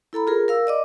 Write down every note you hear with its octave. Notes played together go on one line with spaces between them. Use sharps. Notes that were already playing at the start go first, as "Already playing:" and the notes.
E4 A4 A#5 B5
F4 G#4 A#4
A#4 F5 E6
D5 D#5 D6